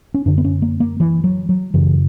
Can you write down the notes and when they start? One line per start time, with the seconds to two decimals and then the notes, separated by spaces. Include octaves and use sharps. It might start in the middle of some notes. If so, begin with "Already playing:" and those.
0.14 C#4
0.25 F#2 D3 D4
0.38 B3
0.45 C#4
0.62 A#3
0.80 A#3
1.00 E3
1.24 F#3
1.49 F#3
1.74 F#2 C#3 E3